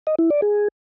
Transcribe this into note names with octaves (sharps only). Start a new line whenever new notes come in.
D#5
E4
D5
G#4